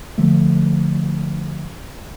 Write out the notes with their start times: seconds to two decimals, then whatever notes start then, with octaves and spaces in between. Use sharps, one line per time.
0.18 D3 F3 A3